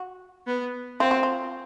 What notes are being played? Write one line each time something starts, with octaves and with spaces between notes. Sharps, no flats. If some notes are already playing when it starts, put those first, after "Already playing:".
Already playing: F#4
B3
C4 F4
F#4
F4